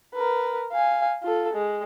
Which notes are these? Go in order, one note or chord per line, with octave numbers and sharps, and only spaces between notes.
A#4 B4
F5 G#5
F4 A4
G#3